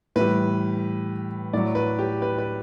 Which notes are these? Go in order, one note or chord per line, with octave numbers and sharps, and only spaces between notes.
A2 E3 G3 B4
A2 F#3 D5
B4
G4
B4
B4